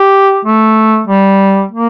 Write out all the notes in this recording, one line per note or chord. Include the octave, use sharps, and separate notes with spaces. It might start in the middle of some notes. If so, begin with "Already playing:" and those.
Already playing: G4
A3
G3
A#3